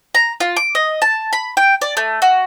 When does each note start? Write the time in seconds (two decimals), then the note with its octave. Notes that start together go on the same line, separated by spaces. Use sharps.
0.15 A#5
0.40 F4
0.56 D6
0.75 D#5
1.02 A5
1.33 B5
1.57 G5
1.81 D5
1.97 A3
2.22 F#4